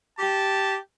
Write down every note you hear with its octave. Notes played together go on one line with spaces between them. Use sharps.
G4 A5